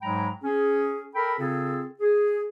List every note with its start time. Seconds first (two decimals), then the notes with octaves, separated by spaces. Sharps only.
0.01 G#2 F#3 G#3 G5 A#5 B5
0.44 C#4 G#4
1.15 A4 A#4 G5 B5
1.39 C#3 C4 F4 G#4 A4
2.00 G#4